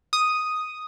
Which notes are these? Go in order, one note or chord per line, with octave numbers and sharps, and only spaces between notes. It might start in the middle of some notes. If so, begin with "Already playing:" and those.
D#6